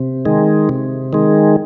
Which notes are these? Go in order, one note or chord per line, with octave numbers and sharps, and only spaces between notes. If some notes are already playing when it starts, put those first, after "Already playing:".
Already playing: C3
D#3 G#3
C3
D#3 G#3